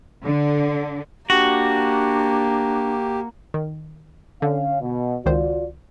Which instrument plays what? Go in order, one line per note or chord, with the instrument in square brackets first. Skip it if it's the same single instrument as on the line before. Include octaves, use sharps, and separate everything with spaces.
[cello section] D3
[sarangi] A#3 [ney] D4 [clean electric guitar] F#4 [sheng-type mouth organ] G4
[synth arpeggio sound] D#3
[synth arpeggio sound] D3 [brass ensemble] C#4 F5
[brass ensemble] B2
[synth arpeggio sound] C#2 D#3 C5 [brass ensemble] F4 F#4 D5